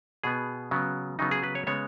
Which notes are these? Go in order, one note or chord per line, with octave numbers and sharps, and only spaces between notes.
B2 B3 G#4
C#3 F#3 B3
C#3 F#3 B3 D#4
G#4
B4
C#5
C#3 G#3 B3 C#5